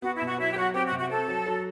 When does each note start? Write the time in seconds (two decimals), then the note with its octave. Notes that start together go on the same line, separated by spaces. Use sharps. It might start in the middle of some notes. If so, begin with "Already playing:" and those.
0.02 B3 F#4
0.15 E4
0.21 B2
0.26 F#4
0.38 F#3 E4
0.52 G4
0.56 F#3 F#4
0.74 C4 G4
0.86 F#4
0.92 C3
0.98 F#4
1.09 C4 A4
1.28 F#3
1.46 F#3